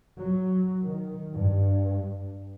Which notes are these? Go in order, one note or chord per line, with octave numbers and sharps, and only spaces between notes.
F#3
D#3
G2